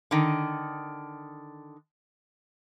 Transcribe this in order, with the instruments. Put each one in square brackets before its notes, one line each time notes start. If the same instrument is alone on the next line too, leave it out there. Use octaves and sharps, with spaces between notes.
[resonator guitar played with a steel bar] D3 D#3